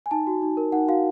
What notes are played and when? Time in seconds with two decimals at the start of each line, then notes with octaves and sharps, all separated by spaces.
0.06 G#5
0.11 D#4 A5
0.27 F#4
0.42 D#4
0.57 A#4
0.72 D#4 F#5
0.88 F#4 F5